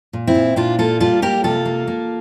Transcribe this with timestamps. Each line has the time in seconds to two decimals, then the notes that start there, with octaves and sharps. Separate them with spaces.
0.13 A#2
0.27 C4 E4
0.35 A#2
0.56 A#2 D4 F4
0.79 A#3 F4 A4
1.00 G3 F4 A4
1.22 A#3 G4 A#4
1.44 C3 F4 A4
1.65 A#3
1.87 A#3